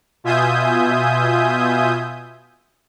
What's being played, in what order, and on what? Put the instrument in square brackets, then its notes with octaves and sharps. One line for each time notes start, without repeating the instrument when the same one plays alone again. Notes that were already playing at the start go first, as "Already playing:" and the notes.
[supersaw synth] B2 F4 E5 G#5 D#6 G6